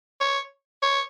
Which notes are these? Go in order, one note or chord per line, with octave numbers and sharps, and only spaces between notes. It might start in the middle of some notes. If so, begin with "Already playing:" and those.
C#5
C#5